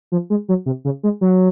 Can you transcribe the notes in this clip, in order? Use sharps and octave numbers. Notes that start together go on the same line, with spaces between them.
F3
G#3
F#3
C3
C#3
G#3
F#3